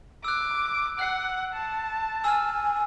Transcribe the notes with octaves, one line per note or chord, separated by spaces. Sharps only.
D6 E6 F#6
F#5 F#6 C7
A5
G#5 E6 F6